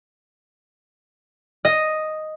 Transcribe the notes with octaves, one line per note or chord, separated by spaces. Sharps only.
D#5